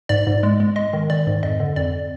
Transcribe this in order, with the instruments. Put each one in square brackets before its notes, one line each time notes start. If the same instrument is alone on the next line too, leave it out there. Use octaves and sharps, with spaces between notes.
[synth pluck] G#2 D5
G#2
G#3
G#3
G#3 D#5
D#3
D#3 D5
G#2
F2 D#5
D3
F2 D5